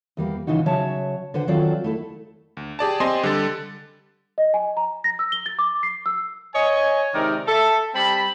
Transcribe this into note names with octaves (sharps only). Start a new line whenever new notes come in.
E2 G3 A#3
A#2 C#3 E3 D#4 F#4
C#3 F#3 C#5 E5 F#5 A5
D3 B4 C5 F#5
D#3 F#3 C4 F4 A4 D5
A3 E4 A4
D2
G4 G#4 D5 A5
C4 G4 D#5 G#5 C6
D3 G3 A4 A6
D#5
G#5
A#5
A#6
E6
G7
A6
D6
C7
E6
C#5 D#5 G#5
C3 D#3 G#3 D#4 A#4 D5
A4 E5
G3 C4 A5 B5